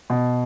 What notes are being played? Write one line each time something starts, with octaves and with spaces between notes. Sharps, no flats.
B2